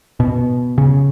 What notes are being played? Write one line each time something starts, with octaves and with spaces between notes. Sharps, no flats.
B2
C#3